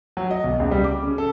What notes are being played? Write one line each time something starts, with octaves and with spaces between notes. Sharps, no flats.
F#3
D#5
B1
C#2
G3
D6
C#3
A4